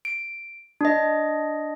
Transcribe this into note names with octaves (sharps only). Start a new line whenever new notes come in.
D7
D4 D#5